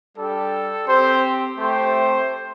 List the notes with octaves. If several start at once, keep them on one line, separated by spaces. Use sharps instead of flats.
G3 D4 G4 A4
C4 G4 C5
A3 C4 G4 C5